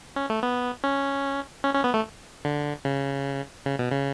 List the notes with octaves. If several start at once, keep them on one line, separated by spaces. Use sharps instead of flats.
C#4
A3
B3
C#4
C#4
C#4
B3
A3
D3
C#3
C#3
B2
C#3